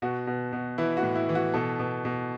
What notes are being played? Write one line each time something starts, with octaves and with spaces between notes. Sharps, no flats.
B2 F#4
B2
B2
E3 E4
F#4
A2
E4
E3
F#4
B2 A4
B2
B2